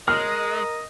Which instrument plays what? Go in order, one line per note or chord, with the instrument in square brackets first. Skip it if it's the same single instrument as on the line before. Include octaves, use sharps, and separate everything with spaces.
[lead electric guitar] G#3 [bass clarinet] A#4 [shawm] D#5 [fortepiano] F6